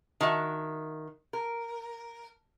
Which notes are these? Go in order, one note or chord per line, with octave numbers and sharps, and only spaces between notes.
D#3 F#4 E5
A#4